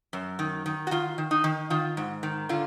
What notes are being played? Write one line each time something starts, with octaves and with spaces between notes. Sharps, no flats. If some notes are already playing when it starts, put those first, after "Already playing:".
F#2
D#3
D#3
F#4
D#3 F4
D#3
D#4
D#3
D#3 F4
G#2
D#3
D3 F4